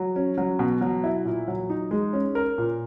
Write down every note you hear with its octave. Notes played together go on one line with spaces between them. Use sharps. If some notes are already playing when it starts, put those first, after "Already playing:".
Already playing: F#3
C#4
F#3
B2
F#3
E4
A#2
F#3
D#4
G#3
C#4
A#4
A#2